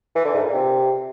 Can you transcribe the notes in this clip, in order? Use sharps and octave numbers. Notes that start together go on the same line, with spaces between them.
E3
D3
G#2
A#2
C3